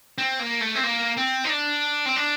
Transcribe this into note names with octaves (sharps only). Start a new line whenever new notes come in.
C4
A#3
A3
C4
A#3
C4
D#4
D4
C4
D4